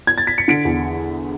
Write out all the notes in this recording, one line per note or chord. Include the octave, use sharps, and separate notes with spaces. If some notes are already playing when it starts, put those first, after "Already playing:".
G#6
A6
B6
C#7
D3 B6 D7
E2